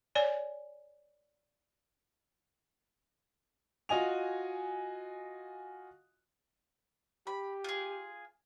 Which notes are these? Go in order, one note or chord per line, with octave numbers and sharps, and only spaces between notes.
C#5 D5 G#5
F4 F#4 D#5 G#5 F7
G4 B5
F4 G#4